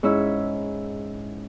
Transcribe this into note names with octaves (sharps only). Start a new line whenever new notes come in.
G#2 C#4 E4 E5